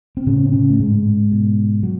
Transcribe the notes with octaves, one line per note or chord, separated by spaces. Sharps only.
C4
A2 C#3 C#4
C4
C#3 C#4
A3
G#2 G#3
B2
F#3